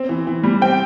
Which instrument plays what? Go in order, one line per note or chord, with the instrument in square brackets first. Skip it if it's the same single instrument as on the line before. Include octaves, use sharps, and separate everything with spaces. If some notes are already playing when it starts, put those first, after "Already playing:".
Already playing: [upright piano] C4
E3
E3
G3
[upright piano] C4 [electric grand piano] G5